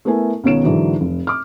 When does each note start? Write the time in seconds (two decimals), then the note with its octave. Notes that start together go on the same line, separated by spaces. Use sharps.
0.05 A3 B3 E4 A#4 G#5
0.44 C#2 B2 D#3 C#5 D7 E7
0.64 G#2 D3 E3 F#3
1.01 F1
1.27 D6 F6